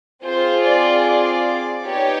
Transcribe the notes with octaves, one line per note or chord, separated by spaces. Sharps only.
C4 F4 G#4 C5
D5
D5
B3 D#4 G4 C#5